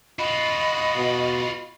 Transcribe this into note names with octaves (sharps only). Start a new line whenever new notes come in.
F4 F#4 D#5 B5
B2